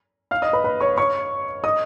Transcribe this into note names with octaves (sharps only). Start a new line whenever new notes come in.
F5 F6
D#5 D#6
B4 B5
B4 B5
C#5 C#6
C#5 C#6
D#5 D#6